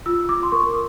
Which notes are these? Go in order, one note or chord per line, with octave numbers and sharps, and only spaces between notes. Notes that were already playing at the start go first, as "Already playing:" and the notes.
F4 E6
D6
C6
A#4 C#6